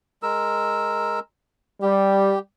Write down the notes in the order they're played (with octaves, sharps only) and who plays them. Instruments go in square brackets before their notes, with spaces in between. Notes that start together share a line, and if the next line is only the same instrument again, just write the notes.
[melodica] G#3 A#4 E6
[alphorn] G3 [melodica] G4